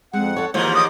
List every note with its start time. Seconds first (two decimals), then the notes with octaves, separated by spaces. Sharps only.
0.13 F2 G#3 C4 F#5
0.36 A4 C#5
0.54 D#2 G#2 E3 F3 A#3 D#4 F4 C#5
0.75 D#5 D6 D#6